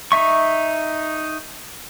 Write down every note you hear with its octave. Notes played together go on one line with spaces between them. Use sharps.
D#4 E5 C#6